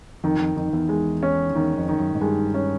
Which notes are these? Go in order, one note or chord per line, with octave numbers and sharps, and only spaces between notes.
F2 D#3
F2
F2 D#3
E2
G#3
C#4
E2 D#3
F2
D#3
F#2
G#2
G2 G#3
C#4